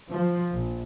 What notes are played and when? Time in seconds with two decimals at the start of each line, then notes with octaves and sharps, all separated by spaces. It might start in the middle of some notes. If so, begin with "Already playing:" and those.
0.10 F3
0.53 A#1